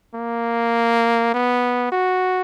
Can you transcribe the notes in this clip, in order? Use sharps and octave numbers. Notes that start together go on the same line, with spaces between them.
A#3
B3
F#4